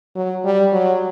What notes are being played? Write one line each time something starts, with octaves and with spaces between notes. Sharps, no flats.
F#3
G3
F#3